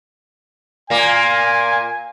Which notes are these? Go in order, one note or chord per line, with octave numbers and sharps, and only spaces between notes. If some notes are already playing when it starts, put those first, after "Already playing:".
A#2 A#3 G#5